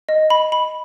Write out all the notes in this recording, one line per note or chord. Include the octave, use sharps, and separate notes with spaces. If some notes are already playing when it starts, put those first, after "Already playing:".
D#5
B5
B5